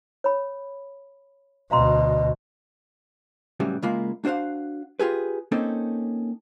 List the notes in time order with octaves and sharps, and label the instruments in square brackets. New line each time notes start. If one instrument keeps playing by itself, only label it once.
[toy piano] C#5 B5
[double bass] D2 B2 [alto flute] D#5 [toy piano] F5 A#5 C6
[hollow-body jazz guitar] A2 C#3 E3 F#3 G3
C#3 G#3 A#3 E4 F4 B5
D4 F#4 C5 F5 F#5
F4 G4 G#4 B4
A#3 C4 C#4 D#4 A4